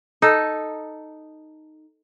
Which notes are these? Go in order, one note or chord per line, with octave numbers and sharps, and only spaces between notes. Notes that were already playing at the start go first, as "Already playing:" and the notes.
D#4 A4